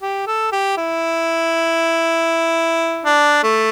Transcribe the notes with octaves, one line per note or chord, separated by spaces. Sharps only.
G4
A4
G4
E4
D4
A3